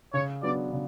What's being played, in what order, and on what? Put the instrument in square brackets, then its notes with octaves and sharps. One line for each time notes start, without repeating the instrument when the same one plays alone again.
[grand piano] C#3 [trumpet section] C#5
[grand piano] F#3 B3 D4 [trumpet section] D5
[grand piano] C#3